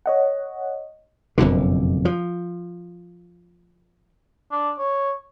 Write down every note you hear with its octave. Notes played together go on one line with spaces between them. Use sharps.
C#5 D#5 F#5
F#1 F2 B2 D3
F3
D4
C#5